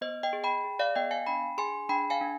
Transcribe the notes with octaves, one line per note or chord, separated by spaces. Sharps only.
B3 C5 D#5
D#5 G5
G#4
G5 B5
G#4
D5 F5
B3 D#5 G5
F5 G#5
D4 G5 B5
G#4 G#5 C6
D4 G5 B5
F5 G#5
D4